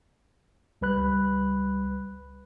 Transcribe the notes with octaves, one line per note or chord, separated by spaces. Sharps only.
C#2 G3 B4 B5 F#6